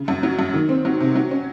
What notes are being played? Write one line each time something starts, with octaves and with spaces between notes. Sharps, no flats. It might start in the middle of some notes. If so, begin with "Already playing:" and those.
Already playing: C#3
F#2
F#3
F#2
D#3
C4
F#3
C3
F#3
C#4